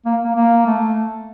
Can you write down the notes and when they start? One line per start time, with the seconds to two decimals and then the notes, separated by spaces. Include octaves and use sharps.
0.05 A#3
0.24 A#3
0.36 A#3
0.66 A3